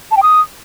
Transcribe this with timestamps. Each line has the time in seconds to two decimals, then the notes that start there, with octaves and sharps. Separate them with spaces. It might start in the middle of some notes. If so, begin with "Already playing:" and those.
0.11 A5
0.17 G5
0.23 D#6